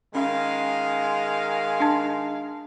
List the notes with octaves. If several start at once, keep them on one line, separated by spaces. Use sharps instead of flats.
D#3 G#3 C#4 F5
D4 A5